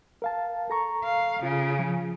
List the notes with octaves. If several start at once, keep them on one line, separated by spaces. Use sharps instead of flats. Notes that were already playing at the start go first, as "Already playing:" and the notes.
A#4 F5 A5
A4 A#5 C#6
F5
C#3 F4
F3